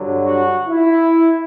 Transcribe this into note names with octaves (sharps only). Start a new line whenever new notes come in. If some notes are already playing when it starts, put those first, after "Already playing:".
Already playing: G2 D3 F#3
F#4
E4